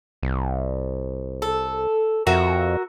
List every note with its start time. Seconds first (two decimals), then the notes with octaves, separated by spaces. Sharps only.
0.23 C2
1.42 A4
2.27 F2 F#4 A#4 E5